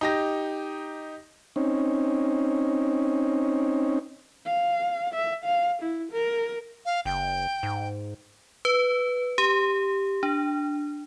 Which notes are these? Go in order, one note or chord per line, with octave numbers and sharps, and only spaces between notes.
D#4 G4 A#6
C4 C#4 D#4
F5
E5
F5
E4
A#4
F5
F#1 G5
G#2
B4
G4
D4